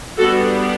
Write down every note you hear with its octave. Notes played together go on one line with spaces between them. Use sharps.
G3 B3 D4 F#4 A4